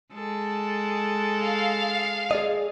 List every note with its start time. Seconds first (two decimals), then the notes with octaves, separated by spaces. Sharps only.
0.14 G#3 A4
1.42 F5
2.31 G#4 D5 D#5